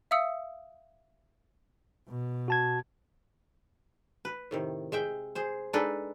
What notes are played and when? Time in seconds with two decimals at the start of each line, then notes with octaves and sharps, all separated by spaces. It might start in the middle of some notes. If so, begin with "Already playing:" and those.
0.11 E5 F5 D#6 E6 C#7
2.08 B2
2.48 F#4 A5 G#6
4.25 B4
4.51 A2 C3 D#3
4.92 G#3 E5 G5
5.35 G#4 C5
5.73 G#3 D4 D#4 A4 B4